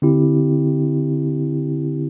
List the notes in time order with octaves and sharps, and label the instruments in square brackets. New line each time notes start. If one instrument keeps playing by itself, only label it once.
[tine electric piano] D3 C4 E4 G4